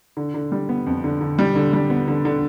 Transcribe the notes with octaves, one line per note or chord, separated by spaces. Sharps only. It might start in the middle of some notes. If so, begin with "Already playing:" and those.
D3
D3
G3
B3
F2
D3
D3
G3
D3
G3
B3
D3
D3